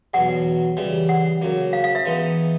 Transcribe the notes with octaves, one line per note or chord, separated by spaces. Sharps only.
E2 B2 F#3 F#5
C#3 E3 G3
F#5
C#3 F#3 A#3
F5
F5
E5
E3 G#3 B3 D#4